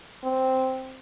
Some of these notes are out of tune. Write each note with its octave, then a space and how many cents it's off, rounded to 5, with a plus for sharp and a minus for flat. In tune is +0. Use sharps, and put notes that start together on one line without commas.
C4 -5